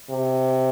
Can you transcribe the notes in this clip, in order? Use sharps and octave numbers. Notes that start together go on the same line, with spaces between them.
C3